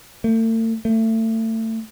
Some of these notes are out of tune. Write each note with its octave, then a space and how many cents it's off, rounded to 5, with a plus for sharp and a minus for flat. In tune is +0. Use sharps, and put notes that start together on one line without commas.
A3 +40
A3 +30